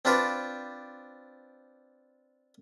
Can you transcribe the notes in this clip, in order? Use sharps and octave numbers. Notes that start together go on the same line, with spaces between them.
C4 D4 F4 B4 C5 D5